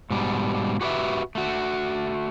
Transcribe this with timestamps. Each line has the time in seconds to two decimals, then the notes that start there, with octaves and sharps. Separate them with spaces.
0.10 G#2 B2 G3
0.81 F#4 G4 B4 D#5 E5
1.35 A3 F#4